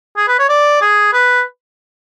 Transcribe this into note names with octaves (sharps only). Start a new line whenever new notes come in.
G#4
B4
C#5
D5
G#4
B4